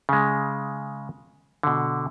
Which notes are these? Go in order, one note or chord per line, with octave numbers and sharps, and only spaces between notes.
C#3 G#3
B2 D3